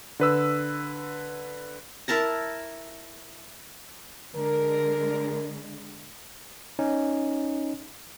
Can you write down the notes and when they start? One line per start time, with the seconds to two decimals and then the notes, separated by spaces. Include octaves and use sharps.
0.20 D3 B4 E6
2.08 E4 A#4 A5 A#5
4.35 D3 G#3 A#4
6.79 C#4 D#4